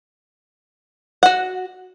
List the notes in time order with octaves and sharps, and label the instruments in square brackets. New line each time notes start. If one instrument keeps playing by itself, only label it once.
[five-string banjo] F#4 F#5